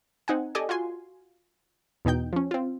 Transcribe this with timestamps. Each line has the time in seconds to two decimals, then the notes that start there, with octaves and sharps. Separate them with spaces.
0.28 C4 D#4 F#5 G#5
0.55 G4 A4 D5 D#5 G#5
0.69 F4 F#4 G#5 C6
2.05 E2 B2 D#4 G5 G6
2.33 F3 C#4
2.51 C4 F4